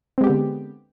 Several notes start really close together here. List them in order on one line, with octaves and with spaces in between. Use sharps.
C4 G#3 G4 B3 D3